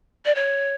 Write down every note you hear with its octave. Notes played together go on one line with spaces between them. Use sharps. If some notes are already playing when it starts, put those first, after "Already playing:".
D5
C#5